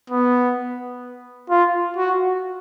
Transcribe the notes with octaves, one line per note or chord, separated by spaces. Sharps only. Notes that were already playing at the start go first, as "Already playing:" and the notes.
B3
F4
F#4